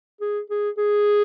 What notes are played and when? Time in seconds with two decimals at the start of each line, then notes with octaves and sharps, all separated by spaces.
0.21 G#4
0.50 G#4
0.77 G#4